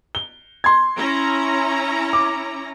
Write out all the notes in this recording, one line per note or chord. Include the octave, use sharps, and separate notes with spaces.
G7
C6 G#6
C#4 E4 A#5
D6